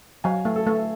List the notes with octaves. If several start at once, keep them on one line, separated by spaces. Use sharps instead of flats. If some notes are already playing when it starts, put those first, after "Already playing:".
F#3 F5 G#5
A3
A4
A3